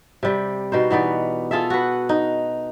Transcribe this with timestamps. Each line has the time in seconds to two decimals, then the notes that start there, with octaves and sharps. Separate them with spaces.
0.23 C3 G3 G5
0.72 B2 D#4 C5
0.91 E3 B3 D#4 D5
1.51 F4 G#4 A4 E5
1.70 F#4 B4
2.09 D#4